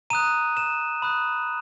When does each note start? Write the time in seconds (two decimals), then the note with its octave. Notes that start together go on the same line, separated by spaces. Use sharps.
0.10 A#5 D#6 F#6 D#7
0.57 E7
1.02 B5 D#6 F#6